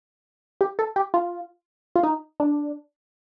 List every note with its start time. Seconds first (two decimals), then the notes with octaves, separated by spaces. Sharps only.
0.61 G4
0.79 A4
0.96 G4
1.14 F4
1.96 F4
2.03 D#4
2.40 D4